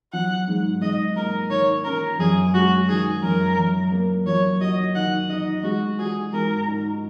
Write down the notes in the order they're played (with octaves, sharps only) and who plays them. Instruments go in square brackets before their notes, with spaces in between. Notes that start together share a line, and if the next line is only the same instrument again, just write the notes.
[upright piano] F#3 [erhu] F#5
[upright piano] G#2
[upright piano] G#2 [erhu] D#5
[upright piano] A#3 [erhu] A#4
[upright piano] D#3 [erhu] C#5
[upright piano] C#4 [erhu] A#4
[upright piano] F#2 [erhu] G#4
[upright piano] G#3 [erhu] F#4
[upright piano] D#3 [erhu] G#4
[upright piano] F#2 [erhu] A#4
[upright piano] F#2
A#3
[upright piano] F#3 [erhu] C#5
[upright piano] F#4 [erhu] D#5
[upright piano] D#3 [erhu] F#5
[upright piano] D#4 [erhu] D#5
[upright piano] G#3 [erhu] F#4
[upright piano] F#4 [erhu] G#4
[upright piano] G#2 [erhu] A#4
[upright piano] D#4